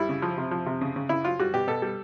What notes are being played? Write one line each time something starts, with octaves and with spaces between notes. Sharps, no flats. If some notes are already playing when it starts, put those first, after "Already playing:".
Already playing: G3 E4
C#3
F3
C3
F3
C3
C#3
C#3
C#3 E4
F#3 F4
G3 F#4
B2 G4
B2 A4
G3